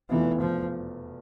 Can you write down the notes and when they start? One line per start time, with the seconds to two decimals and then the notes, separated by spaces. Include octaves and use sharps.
0.09 F1 E2 B2 E3 B3 F4
0.41 F3